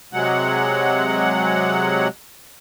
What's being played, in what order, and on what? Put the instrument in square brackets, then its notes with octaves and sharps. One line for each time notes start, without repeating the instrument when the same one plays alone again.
[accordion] C3 F#3 G#3 F#5